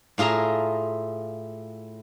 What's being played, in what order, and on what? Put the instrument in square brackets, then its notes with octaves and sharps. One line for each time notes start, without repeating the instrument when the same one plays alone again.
[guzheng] A2 F4 G#4 E5 A#5